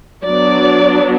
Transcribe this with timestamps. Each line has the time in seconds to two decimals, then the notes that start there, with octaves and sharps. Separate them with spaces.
0.25 F#3 B3 D4 D5